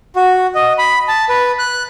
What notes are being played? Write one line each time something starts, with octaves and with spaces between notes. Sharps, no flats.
F#4
D#5
B5
A5
B4
F#6